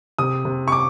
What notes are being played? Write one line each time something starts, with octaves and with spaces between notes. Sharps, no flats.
C3 D#6
C3
C#6
D6